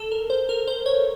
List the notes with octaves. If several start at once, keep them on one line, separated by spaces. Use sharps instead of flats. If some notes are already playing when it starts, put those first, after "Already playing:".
Already playing: A4
A#4
C5
A#4
C5
C#5